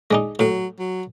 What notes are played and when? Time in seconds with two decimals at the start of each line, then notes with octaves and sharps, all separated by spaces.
0.11 G#3 D4 D#4
0.39 A2 F#3
0.79 F#3